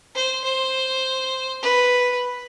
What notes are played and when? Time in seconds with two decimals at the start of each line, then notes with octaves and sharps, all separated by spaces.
0.15 C5
0.44 C5
1.62 B4